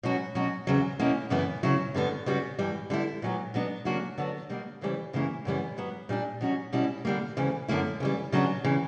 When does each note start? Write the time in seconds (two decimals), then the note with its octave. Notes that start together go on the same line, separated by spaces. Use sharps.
0.03 B2 F#3 C#4 F#4
0.35 B2 F#3 C#4 F#4
0.67 E2 C#3 F#3
0.99 B2 A#3 C#4 E4
1.30 F#2 C#3 E3 B3 E4
1.63 C#3 F#3 C#4 E4
1.94 G2 D3 G3 B3
2.26 C#3 G3 B3 F#4
2.59 G2 E3 G3
2.90 D3 G3 B3 E4
3.22 A#2 F#3 B3
3.54 B2 F#3 B3 D4
3.85 C#3 F#3 A#3 D4 F#4
4.18 D3 F#3 B3 D4
4.50 B2 G3 A#3
4.81 D2 C#3 E3 G3
5.13 F#2 C#3 E3 A#3 E4
5.45 F#2 C#3 E3 G3 B3
5.77 G2 F#3 B3
6.09 A#2 G3 B3 D4
6.41 B2 F#3 C#4 F#4
6.73 B2 G3 C#4 E4
7.05 D3 G3 A#3
7.37 D2 C#3 E3
7.68 F#2 D3 A#3 E4
8.00 C#3 E3 G3
8.32 C#3 F#3 B3 D4
8.64 C#3 E3